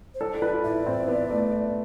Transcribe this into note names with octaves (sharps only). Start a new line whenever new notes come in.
C5
A4 D5
A4
B4
F4
E4 D5
C4
B3
A3